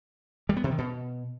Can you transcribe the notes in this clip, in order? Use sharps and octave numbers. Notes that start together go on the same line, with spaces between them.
G3
B3
C3
D#3
B2